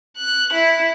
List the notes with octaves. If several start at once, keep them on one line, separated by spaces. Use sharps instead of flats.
F#6
E4